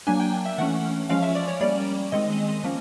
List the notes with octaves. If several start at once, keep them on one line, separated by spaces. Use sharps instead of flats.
F#3 A#3 D4 G#5
G5
E5
E3 A3 C#4 F#5
F3 G#3 C#4 F5
E5
D5
C#5
G3 A#3 C#4 D5
D#3 G#3 C4 D#5
F3 A#3 C#4